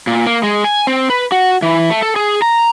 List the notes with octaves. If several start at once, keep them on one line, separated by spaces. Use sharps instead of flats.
A#2
A#3
G#3
G#5
C4
B4
F#4
E3
A3
A4
G#4
A#5